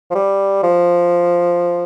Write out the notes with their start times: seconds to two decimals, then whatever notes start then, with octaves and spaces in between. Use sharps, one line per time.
0.10 F3
0.15 G3
0.63 F3